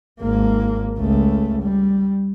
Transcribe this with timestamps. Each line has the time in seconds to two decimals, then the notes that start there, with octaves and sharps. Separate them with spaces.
0.21 G#1 A#3
0.98 C#2 A3
1.62 G3